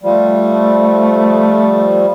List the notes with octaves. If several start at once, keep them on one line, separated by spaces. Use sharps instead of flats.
F3 G3 A3